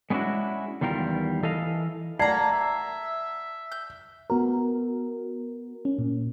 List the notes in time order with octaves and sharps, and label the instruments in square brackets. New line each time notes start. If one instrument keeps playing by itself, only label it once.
[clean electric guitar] G#3 B3 C#4 D4 E4 F#4
E2 D#3 G3 F4 A#4
E3 A4 D#5 F5
[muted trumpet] A#3 [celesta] D5 G#6 C7 [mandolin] F#5 A#5 [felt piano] A5
[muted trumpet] E5
[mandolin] G6
[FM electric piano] B3 F#4 A#4
C#4
A#2